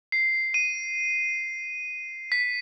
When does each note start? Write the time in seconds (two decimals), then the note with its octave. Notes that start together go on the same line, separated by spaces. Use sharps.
0.12 C7
0.54 D#7
2.32 B6